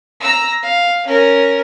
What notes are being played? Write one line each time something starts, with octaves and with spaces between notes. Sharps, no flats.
A#5 E6
F5
C#4 A#4